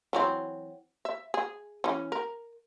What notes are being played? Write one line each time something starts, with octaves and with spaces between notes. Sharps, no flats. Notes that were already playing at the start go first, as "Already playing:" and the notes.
E3 F#3 C4
E5
G#4
E3 C#4
A#4